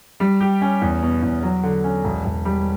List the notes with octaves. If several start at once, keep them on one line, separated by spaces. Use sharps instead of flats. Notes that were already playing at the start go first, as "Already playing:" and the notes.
G3
G4
C#4
E2
B2
E2
F#3
D3
C#4
E1
E1
G3